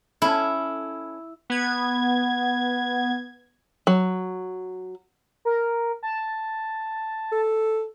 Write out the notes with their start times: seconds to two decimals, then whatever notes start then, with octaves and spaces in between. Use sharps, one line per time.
0.22 C#4 E4 A4
1.50 B3 G#6
3.87 F#3
5.45 A#4
6.03 A5
7.32 A4